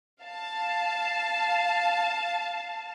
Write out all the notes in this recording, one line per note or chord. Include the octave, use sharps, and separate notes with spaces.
F5 A5